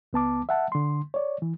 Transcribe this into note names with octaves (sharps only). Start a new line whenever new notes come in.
C#2 B3 A5 D6
E5 F#5 A5
D3 C6
C#5 D5
E3